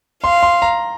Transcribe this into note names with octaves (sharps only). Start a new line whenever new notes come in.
F5 C6
C6
A#5